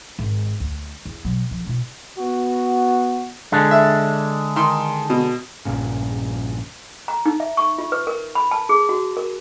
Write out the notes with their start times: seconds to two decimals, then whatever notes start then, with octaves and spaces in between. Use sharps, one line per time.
0.19 G#1
0.60 D2
1.05 E2
1.25 B2 F#3
1.51 F3
1.66 B2 F4
2.19 B3 F#4
3.52 D3 G#3 D4
3.71 E5
4.56 D#3 C6
5.10 B2
5.65 A#1 G2 A#2 C#3
7.08 A#5
7.26 D#4
7.40 E5
7.57 C#6
7.78 F4
7.92 B4
8.07 A#4
8.35 B5
8.51 A5
8.69 G#4
8.89 F#4
9.17 A#4